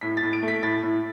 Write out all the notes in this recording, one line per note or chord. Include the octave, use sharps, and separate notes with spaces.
A2 B6
A6
A2
D7
A3
B6
A2 A6
A2